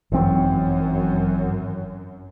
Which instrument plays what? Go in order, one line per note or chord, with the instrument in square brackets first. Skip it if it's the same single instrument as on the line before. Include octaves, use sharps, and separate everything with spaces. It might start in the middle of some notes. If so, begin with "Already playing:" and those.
[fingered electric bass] G#1 E3 C4 [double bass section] F#2